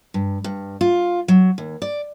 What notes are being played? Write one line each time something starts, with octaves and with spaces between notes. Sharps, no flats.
G2
G2
F4
F#3
D#2
D5